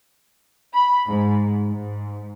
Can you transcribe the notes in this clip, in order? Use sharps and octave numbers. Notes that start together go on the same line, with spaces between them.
B5
G#2
G#2